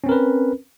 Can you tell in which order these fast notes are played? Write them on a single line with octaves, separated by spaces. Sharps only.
C#4 C4 A#4 B4